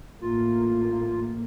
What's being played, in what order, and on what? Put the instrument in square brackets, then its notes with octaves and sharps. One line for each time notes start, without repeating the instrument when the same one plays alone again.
[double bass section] A1 A2 A#3 [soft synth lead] F4